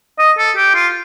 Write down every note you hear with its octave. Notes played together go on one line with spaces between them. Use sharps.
D#5
A4
G4
F4